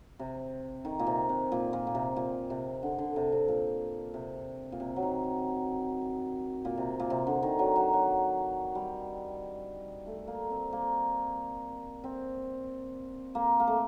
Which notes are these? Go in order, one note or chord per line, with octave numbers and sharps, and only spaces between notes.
C3
D#3
A#2
C3
C3
A#2
A#2
A#2
C3
A#2
C3
D3
D3
C3
C3
A#2
C3
A#2
C3
F#3
D#3
A#2
C3
A#2
C3
D3
D#3
F#3
F#3
F#3
G3
A3
A#3
C4
A#3
C4
A#3
A#3
A3